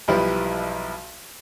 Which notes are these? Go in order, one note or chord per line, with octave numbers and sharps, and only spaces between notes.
B1 F3 G3 E4 G4 B4